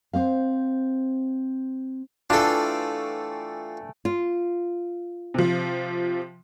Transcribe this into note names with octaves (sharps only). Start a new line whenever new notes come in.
C4 C5 F5
E3 A3 D4 F4 A4 G5
F4
C3 F3